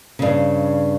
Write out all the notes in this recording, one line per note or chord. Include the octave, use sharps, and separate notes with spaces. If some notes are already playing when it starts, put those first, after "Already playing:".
G2 C#3